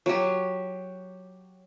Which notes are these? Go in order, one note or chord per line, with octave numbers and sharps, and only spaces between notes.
F#3 G4